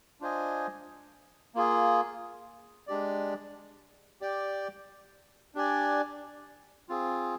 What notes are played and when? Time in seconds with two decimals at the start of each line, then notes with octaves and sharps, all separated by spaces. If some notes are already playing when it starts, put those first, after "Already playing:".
0.20 D4 F4 C5 D#5 G#5
1.55 A#3 F4 G#4
2.87 G#3 D4 G4 D5
4.21 G4 D5 G5
5.55 D4 G4 D5 G#5
6.89 C4 F4 G#4